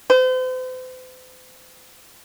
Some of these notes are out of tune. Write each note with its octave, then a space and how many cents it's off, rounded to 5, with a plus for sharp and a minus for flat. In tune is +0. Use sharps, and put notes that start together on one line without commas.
C5 -40